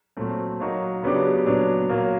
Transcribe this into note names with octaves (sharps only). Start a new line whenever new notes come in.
A#2 F#3 A3 C4
F#3 A#3 D#4 F#4
C#3 F#3 B3 D4 G4
A#2 F#3 B3 D4
A#2 F#3 A#3